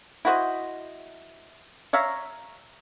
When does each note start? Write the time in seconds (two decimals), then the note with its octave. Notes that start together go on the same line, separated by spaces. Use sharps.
0.25 E4 F#4 C5 D#5
1.93 C#5 E5 F5 A#5